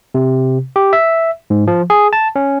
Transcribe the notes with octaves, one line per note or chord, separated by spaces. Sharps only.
C3
G4
E5
G#2
F3
G#4
A5
C#4